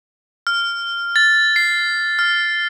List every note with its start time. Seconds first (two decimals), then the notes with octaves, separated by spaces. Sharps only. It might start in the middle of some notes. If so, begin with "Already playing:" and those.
0.47 F6
1.16 A6
1.56 C7
2.19 F6